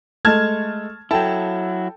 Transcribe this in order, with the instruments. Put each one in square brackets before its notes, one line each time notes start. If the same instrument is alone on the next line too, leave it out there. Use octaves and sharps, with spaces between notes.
[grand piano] G#3 A3 [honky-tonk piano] A5 F6 G#6
[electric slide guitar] F#3 E4 [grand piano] A4 G5 [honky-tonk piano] A5